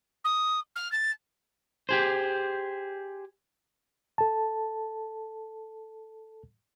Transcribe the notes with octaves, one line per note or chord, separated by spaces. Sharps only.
D#6
F6
A6
G4 G#4 C5
A4 A5